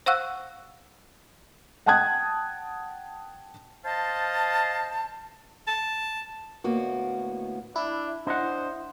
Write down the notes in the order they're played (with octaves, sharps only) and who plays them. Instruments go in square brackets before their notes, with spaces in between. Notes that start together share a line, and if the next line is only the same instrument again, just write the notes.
[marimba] C5 F5 F#5 C#6 E6 F#6
[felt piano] F#5 G5 A5 D#6 F#6 G#6
[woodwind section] C5 D#5 F5 A5
[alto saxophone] A5
[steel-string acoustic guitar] D2 A2 A#3 B3 F#4
[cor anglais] D4 [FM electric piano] E4
[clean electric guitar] D4 D#5 F#5 [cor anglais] C5